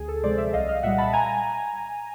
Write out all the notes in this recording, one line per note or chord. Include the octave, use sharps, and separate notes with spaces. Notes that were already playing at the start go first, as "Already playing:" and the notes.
Already playing: D2 G#4
A4
C3 F3 G#3 C5 D5
D5 E5
C2 D#5 F5
D#5 F5
A#2 G3 E5 F#5
A5 B5
G#5 A#5